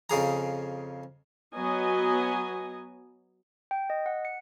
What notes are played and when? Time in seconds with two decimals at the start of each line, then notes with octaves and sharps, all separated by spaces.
0.10 F2 C#3 G#4 A#5
1.53 F#3 B3 D#5 G#5
3.71 G5
3.90 D#5
4.06 F#5
4.25 C#7